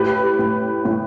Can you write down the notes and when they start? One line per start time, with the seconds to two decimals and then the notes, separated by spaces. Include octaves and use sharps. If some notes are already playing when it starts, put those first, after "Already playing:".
Already playing: A2 G4 B4
0.39 A2
0.85 A2